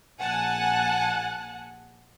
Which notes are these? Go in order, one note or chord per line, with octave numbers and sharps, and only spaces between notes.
A#1 F#5 G#5 A5 F#6